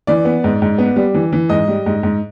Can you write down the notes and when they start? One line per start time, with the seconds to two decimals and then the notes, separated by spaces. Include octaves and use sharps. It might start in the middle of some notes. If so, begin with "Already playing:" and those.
0.07 E3 D5
0.25 B3
0.44 G#2
0.62 G#2
0.78 B3
0.96 G3
1.14 E3
1.33 E3
1.49 G#2 D#5
1.68 G3
1.86 G#2
2.03 G#2